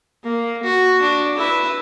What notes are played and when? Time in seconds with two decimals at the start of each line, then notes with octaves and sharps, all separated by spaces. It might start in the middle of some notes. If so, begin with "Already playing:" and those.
0.24 A#3
0.63 F#4
1.02 D4
1.38 E4 B4